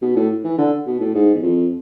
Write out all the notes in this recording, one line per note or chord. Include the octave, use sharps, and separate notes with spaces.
B2
A2
E3
D3
B2
A2
G#2
E2
F2